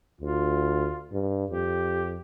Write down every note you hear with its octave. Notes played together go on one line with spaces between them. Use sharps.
D2 F4
G2
F2 G4